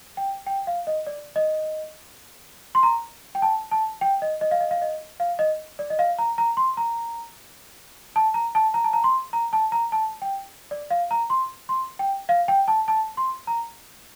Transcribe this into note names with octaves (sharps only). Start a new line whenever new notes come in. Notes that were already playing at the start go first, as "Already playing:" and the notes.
G5
G5
F5
D#5
D5
D#5
C6
A#5
G5
A5
A5
G5
D#5
D#5
F5
D#5
F5
D#5
F5
D#5
D5
D#5
F5
A#5
A#5
C6
A#5
A5
A#5
A5
A#5
A5
A#5
C6
A#5
A5
A#5
A5
G5
D5
F5
A#5
C6
C6
G5
F5
G5
A5
A5
C6
A#5